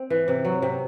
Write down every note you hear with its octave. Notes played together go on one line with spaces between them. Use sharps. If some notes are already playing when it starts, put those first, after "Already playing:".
Already playing: C4
E3
C3
F#3
C3